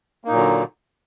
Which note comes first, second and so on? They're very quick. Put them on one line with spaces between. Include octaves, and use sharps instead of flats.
A#3 D#4 A#2 F#3 D3